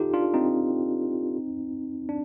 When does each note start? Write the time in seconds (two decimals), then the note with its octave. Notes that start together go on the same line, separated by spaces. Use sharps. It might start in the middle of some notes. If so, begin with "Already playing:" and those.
Already playing: D#4 F4 G4 A4
0.13 D4 F4
0.34 C4 D#4
2.09 D4